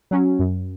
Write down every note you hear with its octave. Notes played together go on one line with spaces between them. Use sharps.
F#3 C#4
F#2